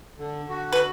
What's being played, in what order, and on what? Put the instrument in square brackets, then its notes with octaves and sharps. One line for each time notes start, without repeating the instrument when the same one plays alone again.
[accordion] D3
F#4
[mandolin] B4